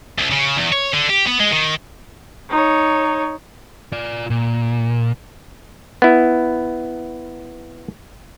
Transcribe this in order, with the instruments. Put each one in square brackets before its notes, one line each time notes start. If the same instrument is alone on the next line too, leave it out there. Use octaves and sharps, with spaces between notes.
[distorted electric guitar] C2
C#3
E2
C#5
D3
G4
B3
G#3
D#3
[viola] D#4 C#5
[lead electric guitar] F4 D5
A#2
[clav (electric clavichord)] B3 E4